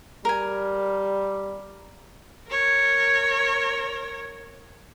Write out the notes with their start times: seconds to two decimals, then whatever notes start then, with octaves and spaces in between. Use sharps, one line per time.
0.25 G3 A#4 G#5
2.48 A#4 C#5